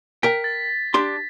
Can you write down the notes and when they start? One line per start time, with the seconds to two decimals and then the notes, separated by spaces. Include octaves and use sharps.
0.23 A#4 G5 B6
0.44 A6
0.94 D4 G4 C6